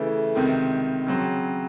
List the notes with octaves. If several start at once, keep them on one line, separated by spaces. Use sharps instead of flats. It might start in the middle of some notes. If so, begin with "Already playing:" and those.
Already playing: C#3 E3 A3
C#2 C3 D#3
C#3 F#3 C4